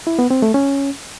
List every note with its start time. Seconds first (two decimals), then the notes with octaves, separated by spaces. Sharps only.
0.07 E4
0.19 B3
0.31 C4
0.42 A3
0.54 C#4